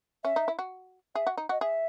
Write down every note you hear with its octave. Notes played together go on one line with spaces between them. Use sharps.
C#4 E5
D#4
E4
F#4
G#4 E5
F#4
D#4
F#4 D#5
G#4 E5